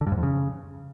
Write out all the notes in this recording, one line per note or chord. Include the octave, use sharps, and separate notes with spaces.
D3
G2
G#2
F2
C#3